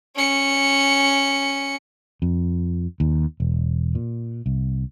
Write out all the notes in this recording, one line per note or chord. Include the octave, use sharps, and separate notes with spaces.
C#4 C#7
F2
D#2
E1
A#2
C2